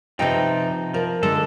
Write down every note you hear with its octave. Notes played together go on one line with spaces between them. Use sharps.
C3 F3 C4 D#4 B4 G5
F3 A#4
D3 G#3 A4 A#4